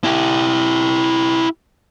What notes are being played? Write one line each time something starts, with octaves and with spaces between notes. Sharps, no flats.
E4 G4